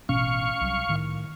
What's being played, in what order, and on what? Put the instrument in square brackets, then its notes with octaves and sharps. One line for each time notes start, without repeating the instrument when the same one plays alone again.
[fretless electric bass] A1 B2 C#4 [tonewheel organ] F5 C#6
[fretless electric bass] C2 F#3
A2 D#3